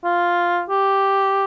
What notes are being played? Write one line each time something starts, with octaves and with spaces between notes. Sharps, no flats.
F4
G4